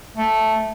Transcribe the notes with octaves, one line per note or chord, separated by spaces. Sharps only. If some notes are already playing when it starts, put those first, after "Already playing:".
A3